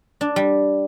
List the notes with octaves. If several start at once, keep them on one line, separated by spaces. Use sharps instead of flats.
D4
G3